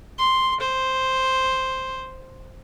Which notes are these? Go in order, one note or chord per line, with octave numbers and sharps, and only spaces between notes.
C6
C5